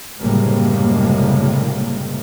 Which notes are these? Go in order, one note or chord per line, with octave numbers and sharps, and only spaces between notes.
F#1 A2 C3 G3 G#3 A#3